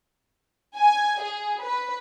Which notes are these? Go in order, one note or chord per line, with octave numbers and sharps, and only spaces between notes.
G#5
G#4
B4